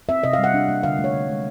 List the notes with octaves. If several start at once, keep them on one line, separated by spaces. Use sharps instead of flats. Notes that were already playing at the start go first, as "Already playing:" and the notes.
C4 E5
C3 D#5
F5
G3
F#5
D4
A#3
D3 F5
A3
C#5
D3
G#3